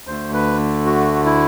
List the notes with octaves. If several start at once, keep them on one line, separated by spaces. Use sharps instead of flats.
D2 D3 A3 C5
B4
F#4
E4